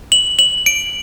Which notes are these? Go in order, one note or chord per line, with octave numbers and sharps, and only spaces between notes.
F#7
F#7
D7